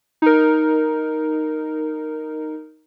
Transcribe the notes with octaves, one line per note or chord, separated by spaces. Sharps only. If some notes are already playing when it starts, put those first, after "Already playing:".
D#4 A#4